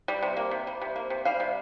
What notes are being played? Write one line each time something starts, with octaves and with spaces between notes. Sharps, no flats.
G3
C3
A#3
C3
G3
C3
A#3
C3
G3 F5
C3